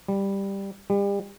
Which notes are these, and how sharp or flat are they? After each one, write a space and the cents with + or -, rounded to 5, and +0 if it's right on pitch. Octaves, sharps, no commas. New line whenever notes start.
G3 +5
G3 +35